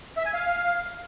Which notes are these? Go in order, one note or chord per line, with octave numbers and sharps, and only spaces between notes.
E5
G#5
F5